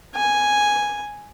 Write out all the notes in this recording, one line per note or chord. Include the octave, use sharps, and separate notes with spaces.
G#5